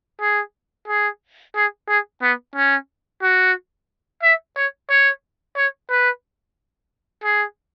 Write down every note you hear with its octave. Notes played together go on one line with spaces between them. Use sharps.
G#4
G#4
G#4
G#4
B3
C#4
F#4
E5
C#5
C#5
C#5
B4
G#4